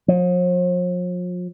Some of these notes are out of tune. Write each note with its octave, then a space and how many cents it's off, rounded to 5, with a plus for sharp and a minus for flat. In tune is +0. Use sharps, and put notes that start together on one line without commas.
F3 +45